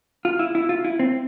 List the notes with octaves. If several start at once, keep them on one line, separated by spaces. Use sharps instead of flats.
F4
E4
E4
F4
E4
C4